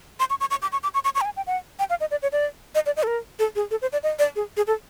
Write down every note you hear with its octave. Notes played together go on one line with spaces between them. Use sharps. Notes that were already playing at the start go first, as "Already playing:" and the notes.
C6
C#6
C#6
C#6
D6
C#6
D6
C#6
C#6
C#6
G5
G#5
G5
F#5
G5
F5
D#5
D5
C#5
D5
D#5
D5
D#5
A4
A#4
A4
G#4
A4
C5
D5
D#5
D5
G#4
G#4
A4